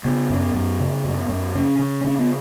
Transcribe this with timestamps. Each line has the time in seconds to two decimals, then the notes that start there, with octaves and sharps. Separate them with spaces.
0.05 C#3 B3
0.30 F#2
0.54 F#2
0.80 C#3
1.04 F#2
1.29 F#2
1.55 C#3 C#4
1.79 C#3
2.04 C#3 C#4
2.19 B3